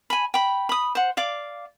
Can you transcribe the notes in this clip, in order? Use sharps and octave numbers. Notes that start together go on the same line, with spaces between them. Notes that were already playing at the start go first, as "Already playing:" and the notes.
G#5 B5
G5 B5
B5 D#6
C5 F#5
D5 F5 D6